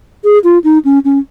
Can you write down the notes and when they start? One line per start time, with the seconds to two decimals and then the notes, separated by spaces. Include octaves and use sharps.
0.24 G#4
0.44 F4
0.64 D#4
0.85 C#4
1.05 C#4